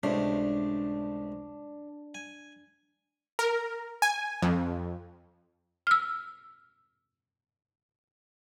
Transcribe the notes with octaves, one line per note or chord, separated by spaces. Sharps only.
C#2 A2 C3 D4
G#5
A#4
G#5
F2
E6 F6